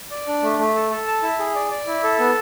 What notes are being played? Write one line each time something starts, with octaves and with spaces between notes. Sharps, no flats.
D5
D4
A3
A3
A4
A4
A5
E4
G#4
D5
D5
E4
A4
B3